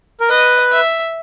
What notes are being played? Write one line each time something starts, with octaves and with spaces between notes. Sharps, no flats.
A#4
B4 D#5
E5